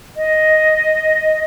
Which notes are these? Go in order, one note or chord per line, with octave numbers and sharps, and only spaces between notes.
D#5